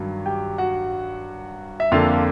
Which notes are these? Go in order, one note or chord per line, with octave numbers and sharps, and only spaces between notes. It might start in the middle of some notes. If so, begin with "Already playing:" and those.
Already playing: G2 D#3 F#3
G4 G5
F#4 F#5
E5
F2 D3 F3 A#3 F4 F5